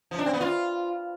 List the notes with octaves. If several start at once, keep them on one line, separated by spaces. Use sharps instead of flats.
F3
D4
C4
B3
F4